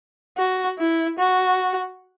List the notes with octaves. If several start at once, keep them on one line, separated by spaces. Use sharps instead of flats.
F#4
E4
F#4